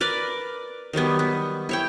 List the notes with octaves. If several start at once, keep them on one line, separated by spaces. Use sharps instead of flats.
A#4 B4 D5
D#3 F#3 G3 B3
B3
E4 C#5 G5